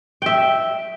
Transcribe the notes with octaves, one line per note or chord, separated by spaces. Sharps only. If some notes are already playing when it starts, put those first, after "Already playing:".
E5 G5